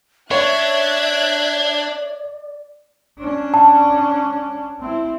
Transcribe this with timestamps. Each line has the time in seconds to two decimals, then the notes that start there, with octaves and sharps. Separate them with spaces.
0.31 D4 C#5 D5 E5 F#6 G#6
3.19 C#4 D4
3.54 A5
4.80 C4 E4